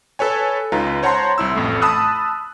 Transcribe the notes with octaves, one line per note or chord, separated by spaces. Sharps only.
A4 B4 C#5 G#5
C#2 D#4 F4 B4 A#5
C5 C#5 F#5 A5 A#5 C6
C2 E4 E6
A1 F2 A2 A3
A5 B5 D#6 E6 F#6